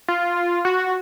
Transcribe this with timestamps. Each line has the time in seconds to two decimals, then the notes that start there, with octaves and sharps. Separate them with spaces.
0.09 F4
0.65 F#4